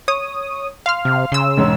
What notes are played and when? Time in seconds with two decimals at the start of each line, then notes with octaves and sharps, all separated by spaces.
0.08 C#5 D#6
0.86 F5 C6 F6
1.05 C3
1.32 C#3 C6 E6
1.57 E1 G#2 C#4